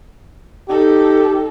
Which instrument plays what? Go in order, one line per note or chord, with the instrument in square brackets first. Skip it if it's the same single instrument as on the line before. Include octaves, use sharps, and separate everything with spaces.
[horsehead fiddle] D#4 A4 [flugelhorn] G4